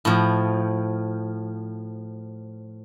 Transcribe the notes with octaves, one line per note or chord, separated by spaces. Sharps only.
A2 F3